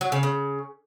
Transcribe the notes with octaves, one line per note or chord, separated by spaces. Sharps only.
F#3
C#3
C#3